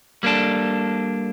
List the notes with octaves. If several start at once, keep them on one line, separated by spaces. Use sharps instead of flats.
G3 A#3 D4 A4